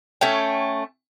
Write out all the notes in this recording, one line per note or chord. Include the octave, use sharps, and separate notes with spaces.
A3 C#4 C#5 G5